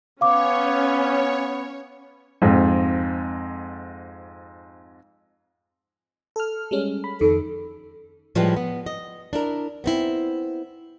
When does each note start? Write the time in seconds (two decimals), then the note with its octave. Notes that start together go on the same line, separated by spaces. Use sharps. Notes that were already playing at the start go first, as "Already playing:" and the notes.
0.21 B3 C#4 C#5 F5 D6
2.42 F2 G#2
6.36 A4 F6
6.71 G3 G#3 C#4
7.04 B5
7.21 F2 D#3 A4
8.35 A2 F3 G3 G#3 B4
8.56 B3
8.86 D#5
9.33 D4 E4 A#4
9.84 B3 C4 E4